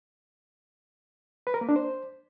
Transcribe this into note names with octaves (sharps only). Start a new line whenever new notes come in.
B4
A#4
A#3
D4
C5